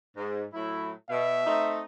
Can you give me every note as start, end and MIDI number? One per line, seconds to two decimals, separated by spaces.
0.16 0.44 44
0.53 0.90 45
0.53 0.90 54
0.53 0.90 64
1.10 1.45 47
1.10 1.82 76
1.46 1.80 57
1.46 1.80 60
1.46 1.80 63